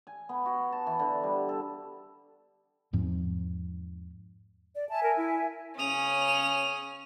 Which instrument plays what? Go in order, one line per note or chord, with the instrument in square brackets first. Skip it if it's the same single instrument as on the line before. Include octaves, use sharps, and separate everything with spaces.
[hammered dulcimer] G#5
B3
F#4
A5
E3
D3
G3
A4
[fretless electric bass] E2 G#2 F3 C4
[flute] D5
[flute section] E5 G#5 [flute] A5
[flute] A#4
E4
[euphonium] C#3 [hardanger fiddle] C#4 [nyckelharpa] D#6 [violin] F7